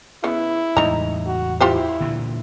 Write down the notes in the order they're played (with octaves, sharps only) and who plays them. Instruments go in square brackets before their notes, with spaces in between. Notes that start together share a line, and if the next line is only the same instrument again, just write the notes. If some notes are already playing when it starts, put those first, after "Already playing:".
[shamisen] C#3 B3 [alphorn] E4
[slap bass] E2 A2 G#3 [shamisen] D#4 A#5
[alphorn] F#4
[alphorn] E4 [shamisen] F4 G4 C5
[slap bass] A#2 D3 E3